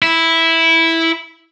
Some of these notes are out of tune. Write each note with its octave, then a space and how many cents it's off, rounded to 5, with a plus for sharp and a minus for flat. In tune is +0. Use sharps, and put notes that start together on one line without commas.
E4 -5